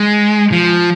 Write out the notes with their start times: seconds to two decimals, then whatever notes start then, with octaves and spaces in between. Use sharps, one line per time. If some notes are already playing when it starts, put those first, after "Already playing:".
Already playing: G#3
0.52 F3